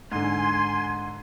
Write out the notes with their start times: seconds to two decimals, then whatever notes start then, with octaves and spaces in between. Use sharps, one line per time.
0.11 G#2 D3 G#5 C6